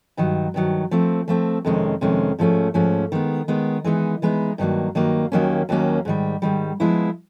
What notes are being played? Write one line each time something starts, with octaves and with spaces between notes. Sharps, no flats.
G2 D#3 F#3
G2 D#3 F#3
F3 A3 C4
F3 A3 C4
F2 C3 D#3 G#3 C#4
F2 C3 D#3 G#3 C#4
G#2 F3 A3 C#4
G#2 F3 A3 C#4
D#3 G#3 B3
D#3 G#3 B3
E3 G#3 B3 D#4
E3 G#3 B3 D#4
G2 D#3 F#3 A#3
G2 D#3 F#3 A#3
D#2 D#3 F#3 A#3 C#4
D#2 D#3 F#3 A#3 C#4
G#2 D#3 G3
G#2 D#3 G3
F3 G#3 B3 E4